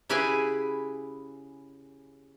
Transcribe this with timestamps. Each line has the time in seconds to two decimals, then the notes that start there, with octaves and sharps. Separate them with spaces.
0.09 C#3 E4 G4 G#4 B4 G#5